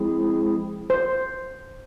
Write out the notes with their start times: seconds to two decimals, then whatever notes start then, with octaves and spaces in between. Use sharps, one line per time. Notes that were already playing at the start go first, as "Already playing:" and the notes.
Already playing: F3 G#3 C4 E4 G#4
0.90 C5